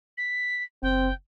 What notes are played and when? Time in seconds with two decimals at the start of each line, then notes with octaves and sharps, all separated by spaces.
0.17 B6
0.83 F#1 C4 G5